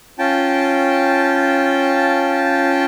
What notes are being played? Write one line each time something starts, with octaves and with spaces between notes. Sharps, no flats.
C#4 F4 G5 A5